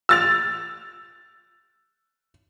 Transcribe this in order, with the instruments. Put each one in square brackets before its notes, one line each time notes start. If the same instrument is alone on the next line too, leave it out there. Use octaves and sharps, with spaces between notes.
[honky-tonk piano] E6 A6 F7